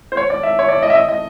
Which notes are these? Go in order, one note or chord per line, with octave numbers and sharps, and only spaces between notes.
C5
C#5
D5
E5
C#5
D5
D#5
E5
D#5
D#5